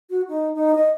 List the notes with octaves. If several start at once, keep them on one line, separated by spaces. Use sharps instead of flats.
F#4
D#4
D#4
D#5